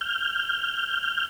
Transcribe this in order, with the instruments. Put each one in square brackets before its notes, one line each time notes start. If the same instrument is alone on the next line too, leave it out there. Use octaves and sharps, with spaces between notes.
[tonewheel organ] F6 G6